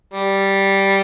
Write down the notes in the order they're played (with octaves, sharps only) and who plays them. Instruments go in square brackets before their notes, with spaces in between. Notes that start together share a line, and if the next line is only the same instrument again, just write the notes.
[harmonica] G3